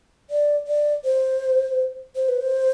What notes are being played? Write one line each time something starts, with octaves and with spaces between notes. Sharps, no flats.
D5
D5
C5
C5
B4
C5